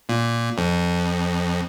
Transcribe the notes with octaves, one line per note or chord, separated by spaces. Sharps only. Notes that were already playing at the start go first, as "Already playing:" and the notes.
A#2
F2